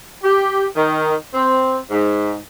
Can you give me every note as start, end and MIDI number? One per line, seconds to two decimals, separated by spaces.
0.24 0.66 67
0.76 1.15 51
1.34 1.77 60
1.90 2.37 44